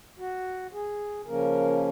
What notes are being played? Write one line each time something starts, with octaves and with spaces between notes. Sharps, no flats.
F#4
G#4
C#3 F3 A#3 C#4 A#4